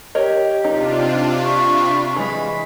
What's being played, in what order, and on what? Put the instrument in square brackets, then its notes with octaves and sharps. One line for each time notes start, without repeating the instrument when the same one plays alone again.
[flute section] G4 [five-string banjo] A#4 C#5 D#5
[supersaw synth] C3 D4 F4 [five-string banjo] D#4
[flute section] B5 C#6
[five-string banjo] E3 G#3 [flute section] B5